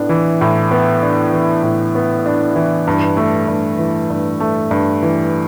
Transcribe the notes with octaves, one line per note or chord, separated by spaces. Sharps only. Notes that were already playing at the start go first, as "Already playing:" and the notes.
Already playing: A2 B3 D4
E3
A2
B3
D4
E3
A2
B3
D4
E3
G2
A3
G2
E3
G2
A3
G2
E3